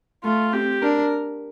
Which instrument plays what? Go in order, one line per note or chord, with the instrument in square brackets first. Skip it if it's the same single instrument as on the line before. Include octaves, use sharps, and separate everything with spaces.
[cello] A3 [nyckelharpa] F4
[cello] C4 [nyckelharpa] G4
[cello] D4 [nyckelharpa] A#4